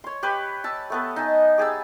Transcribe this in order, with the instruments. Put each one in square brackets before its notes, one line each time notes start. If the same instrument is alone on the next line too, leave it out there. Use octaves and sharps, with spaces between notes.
[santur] C#5 C6
G4 B4 C#6
A5 E6
A3 B3 A4
D#4 D#5 G#5 A5
G4 G#4 A5 E6